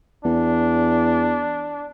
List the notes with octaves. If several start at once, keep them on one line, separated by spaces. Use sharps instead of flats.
E2 D4